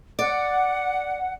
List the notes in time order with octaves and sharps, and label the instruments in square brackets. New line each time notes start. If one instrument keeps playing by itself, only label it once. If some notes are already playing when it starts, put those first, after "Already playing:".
[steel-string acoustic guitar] D5 [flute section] F#5